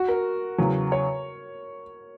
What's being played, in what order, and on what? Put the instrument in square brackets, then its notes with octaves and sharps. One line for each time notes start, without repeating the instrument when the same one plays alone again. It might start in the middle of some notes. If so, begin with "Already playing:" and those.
Already playing: [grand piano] F#4
A#4
[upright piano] E2 C#3 F#3
[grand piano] C#5